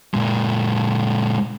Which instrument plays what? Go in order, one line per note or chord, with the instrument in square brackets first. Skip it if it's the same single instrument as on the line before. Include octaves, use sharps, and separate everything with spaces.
[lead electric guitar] A#2 G#3